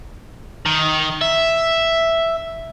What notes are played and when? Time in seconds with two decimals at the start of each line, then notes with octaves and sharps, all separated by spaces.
0.66 D#3
1.21 E5